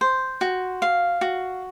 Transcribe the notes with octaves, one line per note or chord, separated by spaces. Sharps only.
C5
F#4
F5
F#4